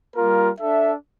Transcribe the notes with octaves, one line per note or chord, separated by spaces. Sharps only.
G3 A#3 F4 A#4
D4 A4 E5